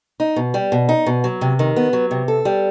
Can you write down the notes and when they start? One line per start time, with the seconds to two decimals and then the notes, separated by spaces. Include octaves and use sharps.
0.20 D#4
0.36 B2
0.54 G3
0.72 B2
0.89 D#4
1.06 B2
1.24 F#3
1.41 C3
1.59 D#3
1.76 B3
1.93 F#3
2.11 C3
2.28 A4
2.45 G3